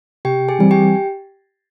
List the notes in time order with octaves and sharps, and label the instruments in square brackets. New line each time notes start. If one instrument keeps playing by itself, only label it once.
[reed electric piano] C3 [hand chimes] G4 G5
[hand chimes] G#4 G#5
[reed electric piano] E3 G3 C4 [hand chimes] G#5
[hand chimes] G4 G5